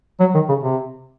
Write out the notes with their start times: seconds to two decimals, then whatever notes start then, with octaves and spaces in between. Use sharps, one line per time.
0.20 F#3
0.35 D#3
0.49 C#3
0.63 C3